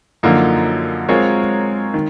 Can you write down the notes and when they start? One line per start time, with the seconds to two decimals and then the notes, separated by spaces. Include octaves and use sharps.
0.23 F#2 D3 F3 A#3 D#4
1.09 G#3 C4 F4 A#4 C#5
1.94 D#3